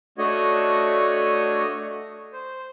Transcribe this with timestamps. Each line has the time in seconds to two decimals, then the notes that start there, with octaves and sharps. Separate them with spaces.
0.18 A3 D4 F#4 C#5 D#5
2.33 C5